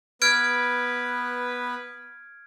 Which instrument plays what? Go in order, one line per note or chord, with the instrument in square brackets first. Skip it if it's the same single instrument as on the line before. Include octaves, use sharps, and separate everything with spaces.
[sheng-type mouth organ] B3 B4 [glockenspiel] F6 G#6 D7